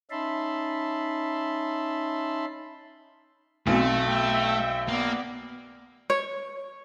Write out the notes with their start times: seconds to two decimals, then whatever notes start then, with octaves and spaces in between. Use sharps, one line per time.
0.11 C#4 D#4 E5 A5 B5 C6
3.67 B1 A3 C4
4.07 E5 G5
4.88 A#3 B3 D5
6.10 C#5